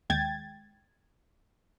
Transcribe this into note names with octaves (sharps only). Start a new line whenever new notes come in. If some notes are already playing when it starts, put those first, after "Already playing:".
D#2 G#3 G5 G#6 A6